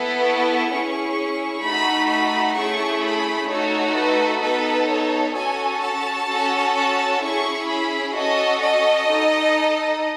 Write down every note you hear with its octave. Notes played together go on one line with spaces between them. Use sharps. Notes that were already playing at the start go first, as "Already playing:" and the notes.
Already playing: B3 E4 A4
C#6
C#4 E4 G#4
A3 D#4 F#4 B5
B5
A3 C#4 E4 G#4 C#6
B5
A3 D#4 F#4 A4 C#5
B4
B3 D#4 A4 B4
C#5
C#4 F#4 A4 G#5
A5
C#4 F#4 A4
A5
C#4 E4 G#4 C#6
B5
C#4 F#4 A4 D#5
D#5
D#4 A4